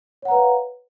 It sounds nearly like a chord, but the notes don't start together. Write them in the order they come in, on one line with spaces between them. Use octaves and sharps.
C#5 F#5 A#5 B4 F5